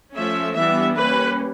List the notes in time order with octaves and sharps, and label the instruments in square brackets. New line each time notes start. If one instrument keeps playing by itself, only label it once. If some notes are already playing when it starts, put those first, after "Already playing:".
[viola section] F3 A3 C#4 E5
E3 G3 B3 D4 E5
G3 A#3 C#4 B4